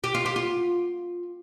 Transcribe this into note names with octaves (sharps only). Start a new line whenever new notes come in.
G4
F4
G4
F4